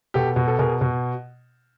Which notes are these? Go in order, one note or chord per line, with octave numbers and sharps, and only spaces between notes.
B2 G4 A4
B2
A4
B2 G#4 A#4
B2